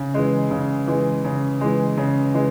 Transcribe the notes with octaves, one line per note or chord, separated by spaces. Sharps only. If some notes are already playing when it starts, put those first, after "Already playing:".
Already playing: C#3
E3 G#3
C#3
E3 G#3
C#3
E3 G#3
C#3
E3 G#3